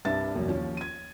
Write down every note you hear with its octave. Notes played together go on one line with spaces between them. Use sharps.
C2 G2 D4 E5 A6
E1 A#1 F#2
D#2 F3 C#4
G#6 D#7